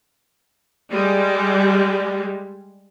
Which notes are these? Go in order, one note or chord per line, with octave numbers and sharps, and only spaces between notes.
G3 G#3